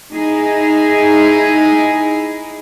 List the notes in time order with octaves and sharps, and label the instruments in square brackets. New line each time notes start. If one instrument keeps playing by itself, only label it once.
[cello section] D#4 E4 G#4